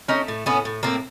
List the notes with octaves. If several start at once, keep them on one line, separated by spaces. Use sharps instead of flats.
A3 C#4 D#4
A2
A2 B3 C#4
A2
A2 A#3 C4